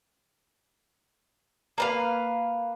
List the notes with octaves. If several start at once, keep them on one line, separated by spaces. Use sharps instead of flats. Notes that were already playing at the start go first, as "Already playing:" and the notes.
A#3 B4 F5